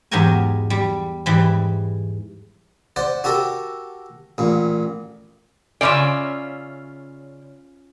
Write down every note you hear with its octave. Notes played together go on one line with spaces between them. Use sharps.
E2 G#2 F#3 G4 A#4 G#5
G3
G#2 E3 G3
C5 D5 F#5
F#4 G4 A4 A#4
A1 A#2
C#3 C#4 F4 D5 E5